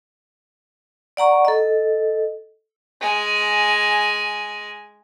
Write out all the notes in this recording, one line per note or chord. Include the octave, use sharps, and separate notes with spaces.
D5 F#5 A#5 C#6
A4 D#5
G#3 G#5